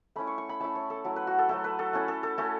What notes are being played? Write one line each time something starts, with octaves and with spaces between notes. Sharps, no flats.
A3 C#4 E4 B5
C#6
C#6
B5
A3 C#4 E4 A5
C#5
A4
F#3 A3 E4
B4
F#4
A4
F#3 A3 E4 A4
B4
A4
A3 C#4 E4
A4
A4
A3 C#4 E4 A4